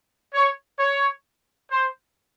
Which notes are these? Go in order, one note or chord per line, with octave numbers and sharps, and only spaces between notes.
C#5
C#5
C5